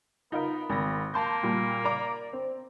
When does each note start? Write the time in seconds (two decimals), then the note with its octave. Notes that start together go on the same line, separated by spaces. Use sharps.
0.32 B3 D#4 F4 A#4
0.69 G#1 A#6
1.14 A#3 A5 C6 G6
1.43 A#2 G3
1.84 D5 A#5 D6
2.33 C4